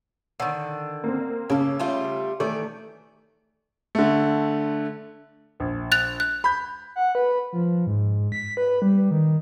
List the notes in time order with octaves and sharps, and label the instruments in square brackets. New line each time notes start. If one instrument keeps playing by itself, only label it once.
[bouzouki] D3 D#3
[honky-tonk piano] A#3 C4
[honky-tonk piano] C#3 C#4 [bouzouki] A#3 A4
[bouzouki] G3 A3 F4
[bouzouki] D#3 E3 D5 [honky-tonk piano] A3
[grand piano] D3 A3
A#1
[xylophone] F#6 A6 F7
F#6
[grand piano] B5 G6
[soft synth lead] F#5
B4
F3
G#2
B6
B4
G3
D#3